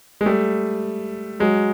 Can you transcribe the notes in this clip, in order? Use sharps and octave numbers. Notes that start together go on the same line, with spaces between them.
G#3
G3 A3
F#3 G#3